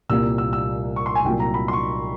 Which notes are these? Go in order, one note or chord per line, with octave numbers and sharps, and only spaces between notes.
C2 A#2 G3 A#3 E6
E6
E6
C#6
C6
G#5
C2 A#2 F#3 G5
A#5
B5
C6
C#6